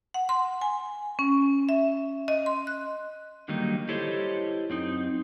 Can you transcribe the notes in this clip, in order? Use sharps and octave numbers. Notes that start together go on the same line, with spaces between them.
F#5
C6
G#5
C#4
E5
D#5
C6
F#6
D3 D#3 F#3 G3 A#3 D#4
E4 G4 A4 C5 C#5 D#5
F#2 C4 D#4